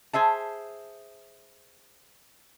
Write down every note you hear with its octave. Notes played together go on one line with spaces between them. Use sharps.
G#4 C5 E5 A5